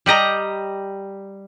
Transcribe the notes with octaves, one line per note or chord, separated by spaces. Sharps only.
G3 G4 D#5 A#5